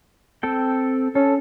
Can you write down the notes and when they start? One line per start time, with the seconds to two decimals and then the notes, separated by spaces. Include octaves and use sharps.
0.43 C4 A4 G5
1.15 C#4 A4